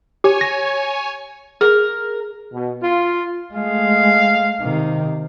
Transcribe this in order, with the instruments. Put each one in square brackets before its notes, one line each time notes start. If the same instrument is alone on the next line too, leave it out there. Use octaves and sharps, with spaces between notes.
[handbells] G4 [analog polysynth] C#5 G#5
[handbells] A#6
[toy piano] G#4 [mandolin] A#4
[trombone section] B2
F4
[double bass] G#3 A3 [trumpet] F5
[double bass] C3 D#3